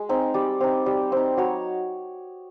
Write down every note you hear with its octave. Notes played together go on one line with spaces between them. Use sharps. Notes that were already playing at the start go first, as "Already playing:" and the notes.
Already playing: G#3
C4 D#4
G3 D5
C4 D#4
G3
C4 D#4
F#3 C#5